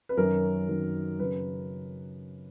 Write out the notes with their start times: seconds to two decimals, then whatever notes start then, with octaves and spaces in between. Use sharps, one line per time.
0.09 B4
0.17 F#2 D#3 F#3 A#4
0.68 F#2 D#3 F#3
1.19 F#2 C#3 F#3 B4